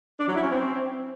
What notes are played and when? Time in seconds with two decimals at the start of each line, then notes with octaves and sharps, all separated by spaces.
0.19 D4
0.27 F#3
0.35 E4
0.43 C#4
0.51 C4